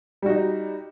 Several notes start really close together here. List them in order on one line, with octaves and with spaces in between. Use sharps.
G3 F#4 D#4